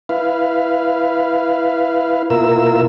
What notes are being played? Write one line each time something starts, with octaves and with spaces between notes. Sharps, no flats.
E4 B4 F5
B2 A#3 E4 F4 A#4 E6